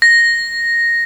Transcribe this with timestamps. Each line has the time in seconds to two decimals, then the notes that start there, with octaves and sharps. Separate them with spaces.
0.02 A#6